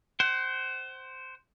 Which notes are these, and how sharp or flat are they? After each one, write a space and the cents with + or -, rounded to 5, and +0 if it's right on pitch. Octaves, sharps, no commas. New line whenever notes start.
C5 +0 F#5 +35